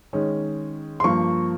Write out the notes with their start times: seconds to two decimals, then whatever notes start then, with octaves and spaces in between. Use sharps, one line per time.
0.13 D#3 G#3 C#4
1.00 C6
1.04 G2 F3 A#3 C#6